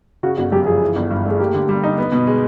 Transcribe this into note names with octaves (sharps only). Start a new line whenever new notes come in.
C#3 F#4
G1 F#4
F#2 G4
F3 G#4
E3
G1
G2
A3 G#4
A#3 G4
D3
G3
D#4
B3
B2
G#3